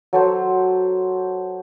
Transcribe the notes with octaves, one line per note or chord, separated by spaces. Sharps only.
F#3 A4 C5